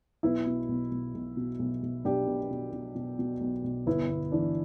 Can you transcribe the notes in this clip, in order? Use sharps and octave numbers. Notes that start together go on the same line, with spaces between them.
B1 B3 E4
B2
B1
B1
B1
B2
B1
B1
B1 D4 G4
B2
B2
B2
B2
B2
B1
B1
G1 B3 E4
G1
E3 D4